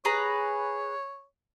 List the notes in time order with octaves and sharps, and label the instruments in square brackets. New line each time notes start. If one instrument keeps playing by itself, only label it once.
[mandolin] G#4 B4 A#5 [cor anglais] C#5